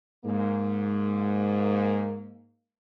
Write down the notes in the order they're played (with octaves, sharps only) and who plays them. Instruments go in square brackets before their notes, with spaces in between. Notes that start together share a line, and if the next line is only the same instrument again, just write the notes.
[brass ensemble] G#2 A#3